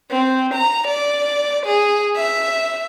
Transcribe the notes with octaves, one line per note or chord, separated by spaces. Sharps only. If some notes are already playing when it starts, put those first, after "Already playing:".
C4
A#5
D5
G#4
E5